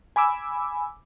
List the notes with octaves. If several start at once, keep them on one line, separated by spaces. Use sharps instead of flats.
G#5 B5 D6 E6